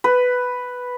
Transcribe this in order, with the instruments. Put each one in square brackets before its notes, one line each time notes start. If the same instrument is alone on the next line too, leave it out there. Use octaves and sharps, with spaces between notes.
[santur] B4